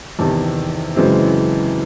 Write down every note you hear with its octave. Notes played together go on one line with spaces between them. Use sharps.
E2 C3 D#3 A5
F#2 C#3 E3 G#3 C4